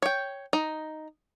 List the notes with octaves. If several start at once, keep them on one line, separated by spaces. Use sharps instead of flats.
C#5 G5
D#4